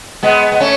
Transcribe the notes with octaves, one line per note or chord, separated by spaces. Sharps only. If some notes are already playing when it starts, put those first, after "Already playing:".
G#3 B3
B3
A3 C#4